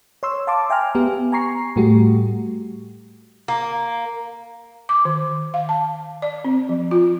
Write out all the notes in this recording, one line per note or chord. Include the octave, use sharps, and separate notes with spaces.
C#5 C6 E6
F5 A5 C6 D6
E5 G5 G#5 A#5 F6
B3 G4
G#5 A#5 C#6 C7
A2 G3 A3 F#4 G4
A#3
D6
D#3
F5
A5
D5
C4
F3
F4